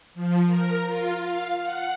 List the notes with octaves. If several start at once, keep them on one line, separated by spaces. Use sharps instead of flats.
F3
A#4
F4
F5
F#5